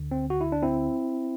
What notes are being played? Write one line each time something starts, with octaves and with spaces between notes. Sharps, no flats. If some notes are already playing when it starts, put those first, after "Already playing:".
Already playing: D2 D3
C4
F#4
E4
D4
C4 E4